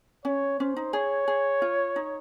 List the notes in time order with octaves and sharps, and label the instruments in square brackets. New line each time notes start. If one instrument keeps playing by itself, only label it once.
[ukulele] C#4 [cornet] C#5
[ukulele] C#4 [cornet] C5
[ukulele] D#4
[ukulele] G#4 [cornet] C#5
[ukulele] G#4
F4
D#4